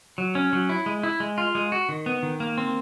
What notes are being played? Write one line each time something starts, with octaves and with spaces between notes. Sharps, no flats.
F#3
C#4
F#3
E4
G#3
E4
G#3
F4
G#3
F#4
D#3
B3
D#3
A#3
C4